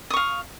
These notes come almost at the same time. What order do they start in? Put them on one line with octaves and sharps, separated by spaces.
D#6 C#6 F5